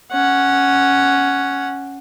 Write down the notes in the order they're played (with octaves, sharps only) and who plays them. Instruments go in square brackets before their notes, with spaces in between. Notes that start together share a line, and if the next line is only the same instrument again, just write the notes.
[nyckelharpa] C#4 F#5